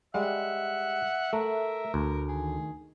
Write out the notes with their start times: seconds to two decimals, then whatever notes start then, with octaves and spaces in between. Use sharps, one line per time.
0.14 G3 G#3 E5 F#5
1.33 A3 A#4
1.94 D2
2.28 D#3 G#4